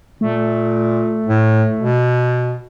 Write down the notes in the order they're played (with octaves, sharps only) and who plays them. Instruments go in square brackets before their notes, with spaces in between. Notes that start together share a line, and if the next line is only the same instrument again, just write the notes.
[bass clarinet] A#2 [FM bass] A3
[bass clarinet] A2
B2